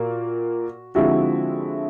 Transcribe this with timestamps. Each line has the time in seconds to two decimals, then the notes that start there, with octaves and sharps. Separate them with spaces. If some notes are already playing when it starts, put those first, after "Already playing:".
Already playing: A#2 A#3 F#4
0.95 D3 F3 G#3 C4 E4 F#4